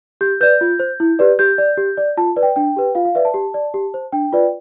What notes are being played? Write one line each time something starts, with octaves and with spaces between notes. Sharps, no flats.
G4 G6
B4 D5 G6
F4
C5
E4
G4 B4 D5
G4 G6
D5
G4
D5
F4 A5
B4 D5
G5
D4 G5
G4 B4
F4 F5
F5
B4 D5 E5
A5
G4
D5
G4
C5
D4 G5
F4 B4 D5